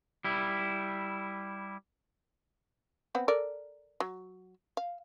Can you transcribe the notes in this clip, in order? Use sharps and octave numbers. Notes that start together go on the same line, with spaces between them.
G3 E4
B3 C4 F#5
A4 A#4 D5
F#3
F5